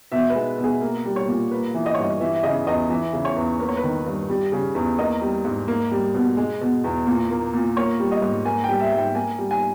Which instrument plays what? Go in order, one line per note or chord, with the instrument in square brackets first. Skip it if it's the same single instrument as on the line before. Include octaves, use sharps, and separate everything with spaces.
[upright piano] B2 E5
B4
G#3
B2
G#4
A#3
G3
C#5
A#2
A#3 B4
E3
D#5
G2 C#5
D#5
E3 E5
E5
C#3 D#5
E2 D#5
E3 E5
C#3
C#5
E2
A#3 B4
C#5
B4
D#3
G2
G3
C#3
E2
A#3 D#5
G3
G#2
A#3
G3
B2
G#3
B2
E2
A#2
A#3
A#2
A#3 C#5
G3
D#5
G#2
A#3 G#5
G3 G5
E5
G#2
G5
A#3 G#5
G3
G#5